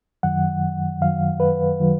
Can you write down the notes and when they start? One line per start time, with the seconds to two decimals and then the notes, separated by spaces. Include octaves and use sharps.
0.23 F#2 D#3 F#3 F#5
1.01 F#2 D#3 F#3 F5
1.40 B4
1.80 D#3 F#3